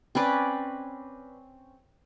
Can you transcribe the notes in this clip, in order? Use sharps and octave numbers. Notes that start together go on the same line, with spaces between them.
C4 C#4 B4 D5